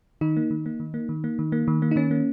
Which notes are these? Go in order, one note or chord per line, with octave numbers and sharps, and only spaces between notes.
D#3 D#4
A#3
D#3
A#3
D#3
A#3
D#3
A#3
D#3
A#3
D#3
A#3
D#4
D#3 C#4
A#3